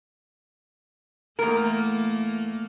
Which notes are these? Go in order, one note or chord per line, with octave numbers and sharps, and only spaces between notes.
E2 A3 A#3 A#4